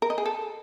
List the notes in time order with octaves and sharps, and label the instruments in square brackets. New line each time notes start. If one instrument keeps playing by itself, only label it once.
[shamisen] A#4
D#5
G#4
A4